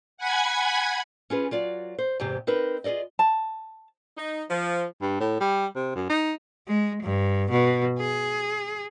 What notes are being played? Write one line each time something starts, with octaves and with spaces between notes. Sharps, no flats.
F#5 G#5 B5 G#6
C#4 F4 G#4 B4
F#3 F4 D5
C5
E2 G#2 C3 G4
C4 D#4 A#4 B4
F4 G#4 A4 D5 D#5
A5
D#4
F3
G2
A2
G3
C3
F#2
D#4
G#3
G2
B2
G#4